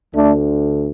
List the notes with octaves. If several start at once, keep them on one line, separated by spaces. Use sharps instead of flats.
D2 D3 A3 D4